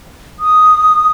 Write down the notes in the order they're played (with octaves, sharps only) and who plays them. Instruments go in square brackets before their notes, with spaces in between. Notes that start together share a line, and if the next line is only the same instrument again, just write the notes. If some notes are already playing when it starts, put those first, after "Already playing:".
[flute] D#6